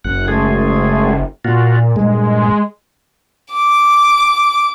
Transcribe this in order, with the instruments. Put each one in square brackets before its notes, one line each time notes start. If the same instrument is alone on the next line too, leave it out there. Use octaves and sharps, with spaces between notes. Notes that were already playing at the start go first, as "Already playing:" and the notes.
[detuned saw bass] F#1 [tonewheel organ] F#5
[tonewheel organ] G#3 A3 G#4
[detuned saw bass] A#2 [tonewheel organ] F4 F#4
[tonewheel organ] G2 A#2 [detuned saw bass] G#3
[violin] D6